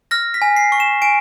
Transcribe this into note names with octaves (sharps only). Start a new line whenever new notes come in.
F6 A#6
B6
G#5
C7
C#6
E7
G#5 D7